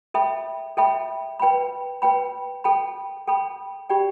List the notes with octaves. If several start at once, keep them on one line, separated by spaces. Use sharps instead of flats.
A4 E5 G5 B5
A4 E5 G5 B5
B4 G5 B5
B4 G5 B5
A4 G5 B5
A4 G5 B5
G4 D5 G5 B5